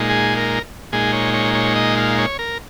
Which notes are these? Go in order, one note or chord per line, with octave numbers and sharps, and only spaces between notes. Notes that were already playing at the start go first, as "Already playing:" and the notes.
Already playing: A#2 G#3 D#4
G#4
A#4
A#2 G#3 D#4 G#4
C#5
C#5
C#5
D#5
F5
C#5
A#4